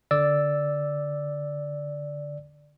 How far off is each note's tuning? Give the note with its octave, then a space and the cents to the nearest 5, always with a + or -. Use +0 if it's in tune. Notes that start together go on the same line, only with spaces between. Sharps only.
D3 -15 D5 +0 E6 +0